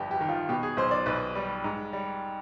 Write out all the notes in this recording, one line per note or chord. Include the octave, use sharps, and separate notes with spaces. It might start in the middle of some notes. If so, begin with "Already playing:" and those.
Already playing: G1 F2 G3 G4
G4
D#3
F4
B2 G4
G#4
B1 C5
D5
B1 B4
G3
G#2
G3